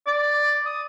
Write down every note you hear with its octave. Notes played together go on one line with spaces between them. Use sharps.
D5
D#6